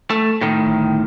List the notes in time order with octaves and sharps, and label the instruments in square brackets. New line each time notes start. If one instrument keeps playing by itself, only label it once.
[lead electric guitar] A3
A2 D#3
[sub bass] G1